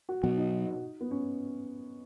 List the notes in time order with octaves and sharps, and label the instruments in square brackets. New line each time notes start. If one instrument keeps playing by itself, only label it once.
[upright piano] F#4
[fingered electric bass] B2 F#3 B3 [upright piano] F#4
[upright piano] D#4
B3
C#4